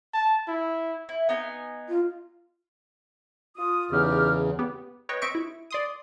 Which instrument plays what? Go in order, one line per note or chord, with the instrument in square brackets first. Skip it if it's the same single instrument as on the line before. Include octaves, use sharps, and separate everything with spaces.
[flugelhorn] A5
E4
[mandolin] E4
B3 D#4 G#5
[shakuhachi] F4
[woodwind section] F4 D#6
[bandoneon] E2 C#3 [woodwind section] D#4 G4 F6
[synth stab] B3 G4
B4 C#5 D#5 G5
C4 D#5 E5 C#6 D7
E4
D5 C6 D#6